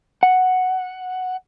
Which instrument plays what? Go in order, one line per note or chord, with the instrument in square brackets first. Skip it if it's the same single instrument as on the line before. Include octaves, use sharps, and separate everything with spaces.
[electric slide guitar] F#5